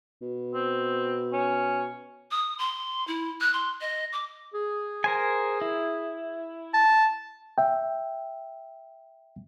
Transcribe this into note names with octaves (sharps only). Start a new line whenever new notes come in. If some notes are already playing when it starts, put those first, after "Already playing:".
B2
C4
C#4
D#6
C6
E4
F#6
C6
D#5
D6
G#4
A#4 C5 G#5
E4
A5
E5 G5